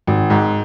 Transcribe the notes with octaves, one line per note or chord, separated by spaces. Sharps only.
G#1
G#2